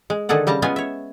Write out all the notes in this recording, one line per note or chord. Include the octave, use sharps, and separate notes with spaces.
G#3
D3 D#3 G#4 A4 F#5
C#3 G3 A5 A#5
G#3 B3 C#4 F4 G#5
C#5 E5